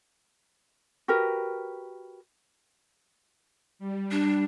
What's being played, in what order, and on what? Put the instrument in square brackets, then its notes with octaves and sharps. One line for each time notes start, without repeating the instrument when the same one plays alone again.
[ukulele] F#4 G4 A#4 B4
[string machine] G3
[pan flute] D4